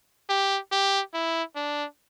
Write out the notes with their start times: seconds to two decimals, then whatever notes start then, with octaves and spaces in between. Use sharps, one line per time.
0.29 G4
0.72 G4
1.14 E4
1.56 D4